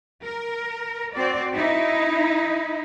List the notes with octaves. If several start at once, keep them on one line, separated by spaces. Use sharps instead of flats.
A#4
C4 F#4 D5
D#4 E4